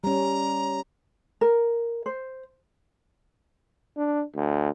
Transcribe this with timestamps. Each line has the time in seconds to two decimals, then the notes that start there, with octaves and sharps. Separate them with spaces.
0.04 G3 C#4 A#5
1.41 A#4
2.06 C5
3.97 D4
4.35 D2